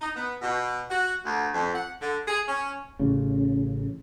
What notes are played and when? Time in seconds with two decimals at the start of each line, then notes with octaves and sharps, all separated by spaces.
0.01 D#4
0.15 B3
0.41 B2
0.90 F#4
1.25 D2
1.53 F2
1.74 F#5
2.01 D3
2.27 G#4
2.47 C#4
2.99 A1 C#3